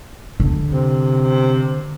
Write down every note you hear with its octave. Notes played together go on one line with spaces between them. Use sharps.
D3
C3